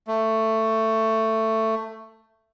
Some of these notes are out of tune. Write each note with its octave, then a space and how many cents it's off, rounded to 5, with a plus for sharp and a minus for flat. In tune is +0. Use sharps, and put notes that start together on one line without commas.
A3 +15